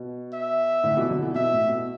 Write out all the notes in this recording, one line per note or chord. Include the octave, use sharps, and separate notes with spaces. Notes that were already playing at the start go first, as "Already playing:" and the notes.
Already playing: B2
E5
A2 D3
B2 E3
D3 F#3
B2 E3
B2 E5
A2
B2